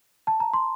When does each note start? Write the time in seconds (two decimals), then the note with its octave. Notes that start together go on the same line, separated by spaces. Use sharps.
0.27 A5
0.40 A#5
0.53 C6